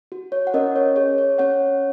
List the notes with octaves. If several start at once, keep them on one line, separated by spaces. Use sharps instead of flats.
F#4
C#5
F#5
C#4 A#4 D#5
C#5
G#4 C#5
C#5
C#4 C#5 F#5